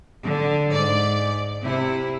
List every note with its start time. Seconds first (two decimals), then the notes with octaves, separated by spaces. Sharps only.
0.22 D3
0.74 G#2 D5
1.63 C3 E4